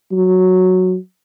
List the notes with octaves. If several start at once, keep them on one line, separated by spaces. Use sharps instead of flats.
F#3